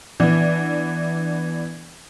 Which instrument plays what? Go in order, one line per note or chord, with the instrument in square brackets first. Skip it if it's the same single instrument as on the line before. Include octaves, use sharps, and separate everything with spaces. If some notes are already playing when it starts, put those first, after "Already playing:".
[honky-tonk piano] E3 B3 D4